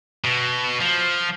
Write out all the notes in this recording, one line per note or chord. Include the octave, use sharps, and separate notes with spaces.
B2
F3